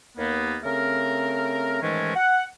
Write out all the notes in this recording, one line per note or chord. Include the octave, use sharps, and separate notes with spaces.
D#2 A#3 B3
C#3 A3 C4 A#4
G#2 D#3 E3 G#3 A3 C#4
F#5